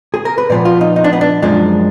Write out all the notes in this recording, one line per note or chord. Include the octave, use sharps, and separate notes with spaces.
G#4
A#4
B4
A#2 F3 B3 D5
F4
D#4
D#4
D4
B3
D4
F#2 F3 G#3 D4